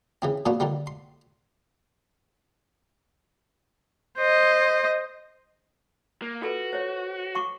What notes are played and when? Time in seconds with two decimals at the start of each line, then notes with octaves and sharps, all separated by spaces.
0.22 C#3 E3 C4
0.46 A#2 F3 B3 D4 F4 F#4
0.60 D3 D#3 F3 G3
0.87 C6
4.19 C5 D#5
6.22 A#3
6.42 F4 F#4 A4 B4
6.73 C5 C#5
7.35 F#5 C#6 D6